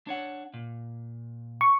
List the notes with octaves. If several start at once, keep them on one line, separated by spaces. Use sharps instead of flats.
D4 C#5 F#5
A#2
C#6